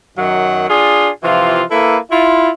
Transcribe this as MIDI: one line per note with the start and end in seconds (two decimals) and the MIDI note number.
0.17 0.69 42
0.17 0.69 51
0.17 0.69 54
0.17 0.69 78
0.69 1.09 62
0.69 1.09 65
0.69 1.09 68
1.23 1.62 48
1.23 1.62 52
1.23 1.62 53
1.23 1.62 65
1.71 1.96 58
1.71 1.96 64
1.71 1.96 69
1.71 1.96 71
2.11 2.49 64
2.11 2.49 65